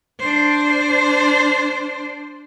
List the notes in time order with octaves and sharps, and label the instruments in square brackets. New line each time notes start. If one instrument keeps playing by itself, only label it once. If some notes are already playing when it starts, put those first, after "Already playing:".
[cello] D4 C5